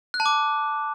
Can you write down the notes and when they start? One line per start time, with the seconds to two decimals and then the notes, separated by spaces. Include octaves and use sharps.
0.14 F#6
0.20 A5
0.26 D6